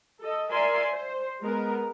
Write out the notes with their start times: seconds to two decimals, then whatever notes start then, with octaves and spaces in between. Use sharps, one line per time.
0.22 A4 D#5
0.52 A#4 D5 E5 G#5 C6
0.91 C5
1.41 G#3 B3 A#4